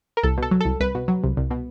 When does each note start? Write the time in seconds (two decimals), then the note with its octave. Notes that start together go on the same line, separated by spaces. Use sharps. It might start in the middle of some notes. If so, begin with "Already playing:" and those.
0.17 A#4
0.23 C2 A4
0.38 B2 A4
0.51 F#3
0.61 C2 A4
0.80 C2 B4
0.95 B2
1.08 F#3
1.23 C2
1.37 C2
1.51 B2